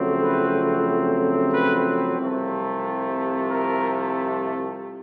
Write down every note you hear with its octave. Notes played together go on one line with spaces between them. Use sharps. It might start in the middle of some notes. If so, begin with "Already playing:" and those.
Already playing: F2 C#3 F#3 A3 C4
B4
B4
C2 C3 F3 A3
A#4